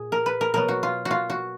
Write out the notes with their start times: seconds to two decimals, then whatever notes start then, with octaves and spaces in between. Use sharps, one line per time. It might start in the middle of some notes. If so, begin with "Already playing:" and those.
Already playing: A#2 G#4
0.12 A#4
0.26 B4
0.41 A#4
0.54 B2 F#3 B3 A#4
0.68 F#4
0.83 F4
1.05 F#4
1.11 F4
1.30 F#4